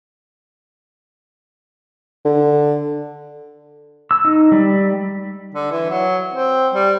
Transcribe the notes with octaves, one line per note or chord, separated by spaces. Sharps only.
D3
E6
D#4
G3
D3
E3
F#3
C4
G3